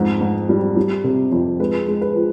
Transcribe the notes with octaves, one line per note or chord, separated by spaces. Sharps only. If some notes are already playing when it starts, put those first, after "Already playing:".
Already playing: F2 G#2
G#2
G3
G3
C3
F2
G#3 B4
G#3
B4
F3